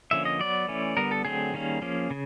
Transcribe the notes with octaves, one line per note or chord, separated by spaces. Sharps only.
D3 F3 A#3 C#4 E5
D#5
F#3 B3 D5
E3 A3 C#4
D3 G3 B3 A#4
A4
D3 F#3 A3 C4 G#4
D#3 G3 A#3 C#4
F3 A#3 C#4
C#3